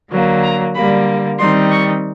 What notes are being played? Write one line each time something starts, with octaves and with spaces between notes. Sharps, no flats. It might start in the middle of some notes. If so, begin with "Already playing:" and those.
D3 F#3 A#3
A#5
D3 G3 A#3 B5
D#3 G3 C4 D#4 C6
C#6